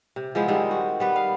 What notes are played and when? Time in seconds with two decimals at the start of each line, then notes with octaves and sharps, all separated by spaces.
0.16 C3
0.35 F3 G#3 B3 E4
0.48 D#3 G3 G#3 C4
0.71 F#4
1.00 G3 B3 B4
1.16 F5